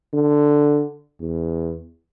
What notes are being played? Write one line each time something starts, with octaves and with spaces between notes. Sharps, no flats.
D3
E2